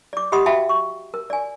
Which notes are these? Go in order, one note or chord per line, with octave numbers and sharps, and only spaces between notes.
D5 D6
G4 D#5 F#5 B5 C6 D#6
F#4 E5 F5 G5 A5 B5
C#6
A#4
D5 G#5